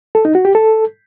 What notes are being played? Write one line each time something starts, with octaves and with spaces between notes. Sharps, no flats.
A4
D#4
F#4
G4
A4